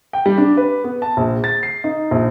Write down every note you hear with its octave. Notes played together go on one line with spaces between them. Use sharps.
G5
G3
D4
B4
B3
A5
A#1
A6
C7
D#4
A#1